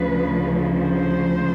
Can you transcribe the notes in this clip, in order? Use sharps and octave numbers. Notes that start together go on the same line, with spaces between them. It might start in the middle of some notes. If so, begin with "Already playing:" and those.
Already playing: D2 C#3 F3 B4
C5